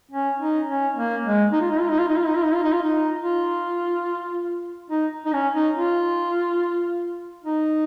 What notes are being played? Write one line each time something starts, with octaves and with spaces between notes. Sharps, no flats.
C#4
D#4
C#4
A#3
G#3
D#4
F4
D#4
F4
D#4
F4
D#4
F4
D#4
F4
D#4
F4
D#4
F4
D#4
F4
D#4
D#4
C#4
D#4
F4
D#4